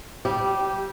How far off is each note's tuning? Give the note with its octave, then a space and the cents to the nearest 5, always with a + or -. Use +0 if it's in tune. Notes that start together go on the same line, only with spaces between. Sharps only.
G3 -20 G4 +0